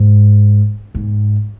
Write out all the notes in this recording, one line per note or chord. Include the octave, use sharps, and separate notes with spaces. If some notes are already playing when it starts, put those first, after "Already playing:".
Already playing: G#2
G#2